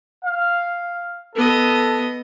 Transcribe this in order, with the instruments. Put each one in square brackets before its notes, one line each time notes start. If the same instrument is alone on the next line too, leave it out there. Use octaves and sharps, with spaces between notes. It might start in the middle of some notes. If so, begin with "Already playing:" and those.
[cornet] F5
[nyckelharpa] B3 D#5 [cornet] A4